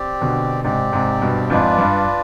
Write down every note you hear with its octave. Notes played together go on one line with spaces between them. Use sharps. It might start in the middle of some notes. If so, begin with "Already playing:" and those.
Already playing: C4 G4 D5
B2 D3
G#2 C3 C4 G4 D5
G#2 C3
G2 B2
F2 G#2 D4 F4 B4 D5
G2